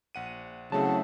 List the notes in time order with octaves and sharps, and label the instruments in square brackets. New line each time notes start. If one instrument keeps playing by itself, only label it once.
[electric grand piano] A#1 F#5 D#7
[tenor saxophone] C#3 [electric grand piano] F#3 A3 C4 [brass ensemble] E4 E5 F#5 [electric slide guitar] A5